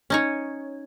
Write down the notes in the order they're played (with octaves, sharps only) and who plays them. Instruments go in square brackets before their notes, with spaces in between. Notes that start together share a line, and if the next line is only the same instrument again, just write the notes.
[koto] C#4 D#4 C#5